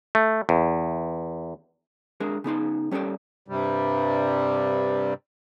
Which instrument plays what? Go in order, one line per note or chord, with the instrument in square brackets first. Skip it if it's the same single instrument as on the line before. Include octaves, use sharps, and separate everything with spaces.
[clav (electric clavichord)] A3
E2
[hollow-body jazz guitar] G#3 D4 G#4 A#4
C#3 B3 D#4 C6
G3 C#4 G4 A4 D5
[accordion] G2 C3 G3